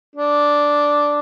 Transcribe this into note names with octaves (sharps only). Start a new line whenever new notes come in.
D4